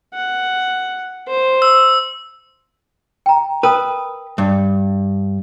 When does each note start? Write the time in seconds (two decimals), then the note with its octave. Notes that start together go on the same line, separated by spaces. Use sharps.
0.13 F#5
1.28 C5
1.62 E6
3.26 G5 A#5
3.63 A#4 B4 G5 D#6
4.38 G2